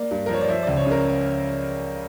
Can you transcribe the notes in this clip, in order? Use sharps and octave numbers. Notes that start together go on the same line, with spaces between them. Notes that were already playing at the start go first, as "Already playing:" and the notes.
Already playing: A#3 D5
G2
A#4
F3 C#5
D5
F3 E5
C#2 D5
C#5
C#3
A#4